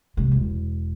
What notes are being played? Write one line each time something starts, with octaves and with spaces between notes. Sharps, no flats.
C3 G#3
E1